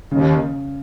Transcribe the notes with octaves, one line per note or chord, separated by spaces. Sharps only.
D#2 C#3